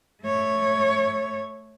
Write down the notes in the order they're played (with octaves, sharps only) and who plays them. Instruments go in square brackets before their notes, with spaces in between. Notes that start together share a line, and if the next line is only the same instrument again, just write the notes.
[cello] A3 C#5